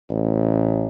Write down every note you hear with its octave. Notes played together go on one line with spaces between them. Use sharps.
A1